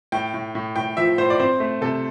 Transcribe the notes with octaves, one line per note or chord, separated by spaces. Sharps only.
A2 G5
A2
A2
A2 G5
F3 E5
A2 C5
D5
C4 C5
A3
C3 A4